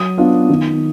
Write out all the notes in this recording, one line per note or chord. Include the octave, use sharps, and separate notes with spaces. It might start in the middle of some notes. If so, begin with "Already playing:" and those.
Already playing: F#3 D#6
B3 D4 F4
D#3